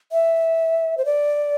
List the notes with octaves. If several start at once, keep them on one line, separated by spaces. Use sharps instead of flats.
E5
C5
D5